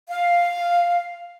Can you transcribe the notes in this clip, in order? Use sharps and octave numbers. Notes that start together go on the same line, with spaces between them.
F5